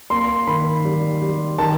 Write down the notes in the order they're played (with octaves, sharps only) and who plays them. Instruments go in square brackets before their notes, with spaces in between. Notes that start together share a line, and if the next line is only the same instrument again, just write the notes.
[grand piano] A#3 C6
D#3 B5
G3
G3
D#3 A5